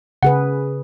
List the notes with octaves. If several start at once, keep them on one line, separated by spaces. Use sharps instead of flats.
C#3 G#4 B4 F#5